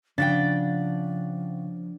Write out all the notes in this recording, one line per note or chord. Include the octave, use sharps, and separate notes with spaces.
C#3 F3 D4 F#5 G5 A6